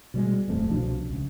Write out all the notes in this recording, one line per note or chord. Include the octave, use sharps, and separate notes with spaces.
B2 G3 G#3
D1 F2 A3
C2 B2 F3 D4
C#2